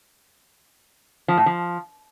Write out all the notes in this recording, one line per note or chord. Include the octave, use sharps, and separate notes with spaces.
F3
A2
F3